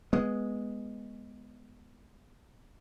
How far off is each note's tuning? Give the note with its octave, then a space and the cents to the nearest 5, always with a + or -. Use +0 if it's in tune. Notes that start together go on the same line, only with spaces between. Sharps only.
G#3 +0 B3 +0